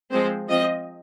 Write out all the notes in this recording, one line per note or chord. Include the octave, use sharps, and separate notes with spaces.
F3 G#3 C4 C5
F3 C4 D#5